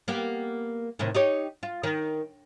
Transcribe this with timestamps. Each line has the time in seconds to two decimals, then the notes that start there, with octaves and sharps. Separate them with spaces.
0.08 A#3 B3 G4
0.99 A2 C3 D#3
1.15 D#4 G4 C#5
1.63 F4
1.83 D#3